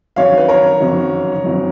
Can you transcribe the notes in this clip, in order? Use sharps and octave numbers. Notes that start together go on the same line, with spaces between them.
F#1 F2 D#3 F#3 C#5 F5
B4
A#4 C#5
F#1 F2 D#3 F#3
F#1 F2 D#3 F#3